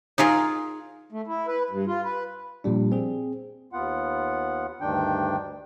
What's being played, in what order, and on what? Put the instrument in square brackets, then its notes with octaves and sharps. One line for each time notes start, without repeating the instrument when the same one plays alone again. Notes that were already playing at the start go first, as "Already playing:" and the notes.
[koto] D#4 F4 G#4 A#4
[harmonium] A3
E4
B4
G2
F4
B4
[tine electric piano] A#2 F3 G3 D4
C4 G#4
[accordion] D#2 B3 F4 F#5
D2 G2 D#3 D4 G5